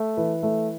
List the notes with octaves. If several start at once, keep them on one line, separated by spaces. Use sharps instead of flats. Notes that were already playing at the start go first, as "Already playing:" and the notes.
Already playing: A3
E3 B4
A3